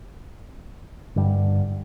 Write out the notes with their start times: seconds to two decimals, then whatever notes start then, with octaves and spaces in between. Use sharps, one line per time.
1.16 G2 D3 G3